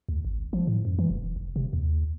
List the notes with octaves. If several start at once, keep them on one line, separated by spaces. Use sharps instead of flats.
D2
G#1
F3
A2
F#2
E3
E1
F1
C3
D#2